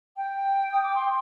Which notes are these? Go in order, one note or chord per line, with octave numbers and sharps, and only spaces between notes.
G5
D#6
D6
C6